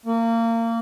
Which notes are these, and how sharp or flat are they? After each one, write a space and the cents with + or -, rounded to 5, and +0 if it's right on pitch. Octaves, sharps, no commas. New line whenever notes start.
A#3 -25